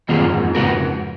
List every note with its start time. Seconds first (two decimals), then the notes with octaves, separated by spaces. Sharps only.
0.08 F2 D#3 A#3 F4 G#4
0.20 F#2
0.32 F2 G#2
0.43 F2 G#2
0.55 C#3 G#3 B3 F#4 A#4